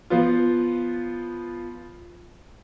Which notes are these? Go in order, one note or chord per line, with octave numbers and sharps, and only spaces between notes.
F3 B3 F4